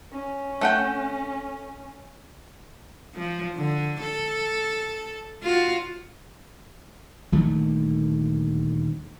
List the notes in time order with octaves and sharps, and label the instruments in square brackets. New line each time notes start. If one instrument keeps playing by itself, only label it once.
[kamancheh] C#4
[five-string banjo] A3 F#5 G5
[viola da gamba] F3
D3
A4
F4 F#4
[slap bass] D#1 D2 D#3 A3